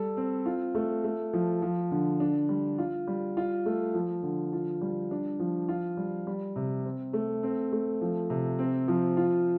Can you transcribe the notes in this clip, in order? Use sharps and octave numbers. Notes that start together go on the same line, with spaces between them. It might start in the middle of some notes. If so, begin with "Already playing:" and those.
Already playing: G3 A4
C4
F4
A3
A3
F3
F3
D3
D4
G3
F4
G3
F4
A3
F3
D3
F4
G3
D4
F3
F4
G3
G3
C3
C4
A3
C4
A3
F3
C3
C4
F3
F4